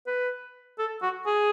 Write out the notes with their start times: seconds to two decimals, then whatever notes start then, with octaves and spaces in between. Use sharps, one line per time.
0.07 B4
0.79 A4
1.02 F#4
1.26 G#4